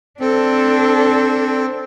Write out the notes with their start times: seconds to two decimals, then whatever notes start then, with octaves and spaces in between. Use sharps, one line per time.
0.20 C4 D4 A4